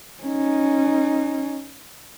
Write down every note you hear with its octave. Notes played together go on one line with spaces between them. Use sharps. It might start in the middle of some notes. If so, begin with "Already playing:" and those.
C#4 D#4